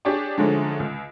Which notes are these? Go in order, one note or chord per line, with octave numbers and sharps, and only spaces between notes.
D4 G4 G#4 C#5 D5
D3 F3 G#3 A3 C#4 D#4
C#2